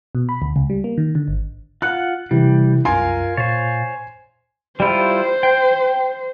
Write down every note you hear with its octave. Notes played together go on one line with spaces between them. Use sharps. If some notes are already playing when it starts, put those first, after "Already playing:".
B2
B5
D2
C#2
G3
A#3
D#3
D3
G#1
F4 F#5 F#6
C3 E3 G3
C2 F#2 F4 A#4 G#5 C6
A#2 C5 C#5 F5 A6
G3 E4 F4 C5
G5